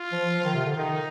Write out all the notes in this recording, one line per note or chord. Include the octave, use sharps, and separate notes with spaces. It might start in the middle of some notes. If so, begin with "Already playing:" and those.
Already playing: F4
F3
F3
D#3
C3
D3
D#3 D#4